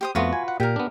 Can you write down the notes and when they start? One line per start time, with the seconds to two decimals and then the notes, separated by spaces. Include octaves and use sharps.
0.01 G4 C5 D#6
0.15 F2 A3 B3 F4 F#4 B4
0.33 G#5
0.48 F#5
0.60 A#2 G4 A#4
0.76 B3 D4